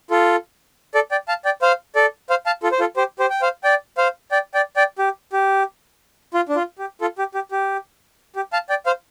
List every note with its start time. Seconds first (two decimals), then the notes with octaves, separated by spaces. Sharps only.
0.11 F4 A4
0.94 A4 D5
1.11 D5 G5
1.28 F5 A5
1.45 D5 G5
1.62 C5 F5
1.96 A4 D5
2.30 C5 F5
2.46 F5 A5
2.63 F4 A4
2.72 C5
2.80 F4 A4
2.97 G4 C5
3.19 G4 C5
3.30 G5
3.42 C5 F5
3.64 D5 G5
3.98 C5 F5
4.32 D5 G5
4.54 D5 G5
4.76 D5 G5
4.99 G4
5.33 G4
6.34 F4
6.49 D4
6.56 F4
6.79 G4
7.01 F4 A4
7.18 G4
7.35 G4
7.52 G4
8.36 G4
8.53 F5 A5
8.70 D5 G5
8.86 C5 F5